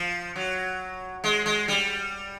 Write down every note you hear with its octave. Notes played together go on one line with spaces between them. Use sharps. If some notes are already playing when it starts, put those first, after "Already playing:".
Already playing: F3
F#3
G#3
G#3
G3